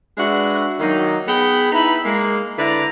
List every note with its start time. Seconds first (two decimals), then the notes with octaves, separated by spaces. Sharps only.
0.18 G#3 D4 F#4 B4 E5
0.80 D#3 F#3 A#3 D#4
1.28 B3 G#4 G5 B5
1.72 D#4 E4 B4 E5 B5
2.05 G#3 A#3
2.57 D3 E4 B4 D5 A#5